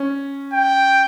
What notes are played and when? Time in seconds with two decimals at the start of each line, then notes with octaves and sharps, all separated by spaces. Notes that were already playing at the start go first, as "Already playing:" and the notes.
Already playing: C#4
0.53 G5